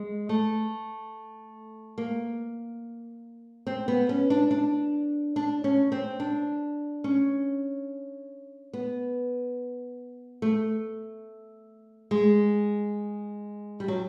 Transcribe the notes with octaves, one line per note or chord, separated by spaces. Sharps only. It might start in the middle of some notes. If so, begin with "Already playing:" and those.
Already playing: G#3
A3
A#3
C4
B3
C#4
D4
D4
D4
C#4
C4
D4
C#4
B3
A3
G#3
G3
F#3